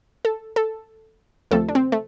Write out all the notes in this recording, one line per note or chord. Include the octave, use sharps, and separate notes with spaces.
A4
A4
D2 C3 F3 A3 A4
D4
C4
A3